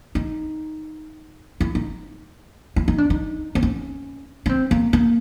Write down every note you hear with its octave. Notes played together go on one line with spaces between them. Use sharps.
D#4
E4
D#4
E4
D#4
D4
D#4
C4
C#4
C#4
C4
A#3
A#3